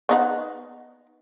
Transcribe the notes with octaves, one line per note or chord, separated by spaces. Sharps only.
B3 D#4 F#5